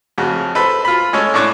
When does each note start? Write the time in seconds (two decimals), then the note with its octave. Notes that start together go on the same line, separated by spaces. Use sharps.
0.18 F2 C#3 F#4
0.55 A4 B4 C5 B5
0.85 F4 B5
1.13 G#3 C#4 A4 C#5
1.34 A2 C#4 D4 C#6 D6 F#6